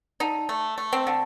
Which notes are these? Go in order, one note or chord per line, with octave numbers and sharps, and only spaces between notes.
D3 D#4
A3
A3
C4
D3